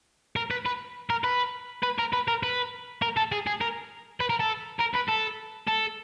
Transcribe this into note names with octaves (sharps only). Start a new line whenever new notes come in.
A#4
B4
B4
A#4
B4
B4
A#4
B4
A#4
B4
A#4
A4
G#4
G#4
A#4
B4
A#4
A4
A#4
B4
A4
A4